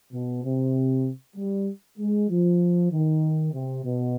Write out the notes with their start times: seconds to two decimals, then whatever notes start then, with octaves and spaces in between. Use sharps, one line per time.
0.13 B2
0.44 C3
1.36 G3
1.98 G#3
2.29 F3
2.92 D#3
3.53 C3
3.84 B2